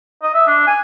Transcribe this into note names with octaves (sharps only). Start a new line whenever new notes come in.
D#5
E5
D4
G#5